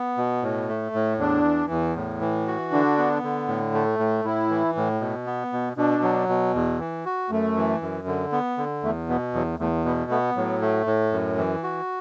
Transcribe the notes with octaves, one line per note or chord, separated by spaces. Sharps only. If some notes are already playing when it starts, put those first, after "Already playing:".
Already playing: B3
B2
A2
A3
A2
E2 D4
E3
E2
A2
E3
F#4
D3 D4
B3
D3
A2
A3
A2
A2 E4
E3
A2
B2
B3
B2
B2 D4
F#3
B2
E2
E3
F#4
F#2 A3
E3
F#2
D3
B3
D3
E2 A3
B2 B3
E2 F#3
E2 A3
B2 B3
A3 B3
A2 F#3
A3
A2
F#2
E3
F#4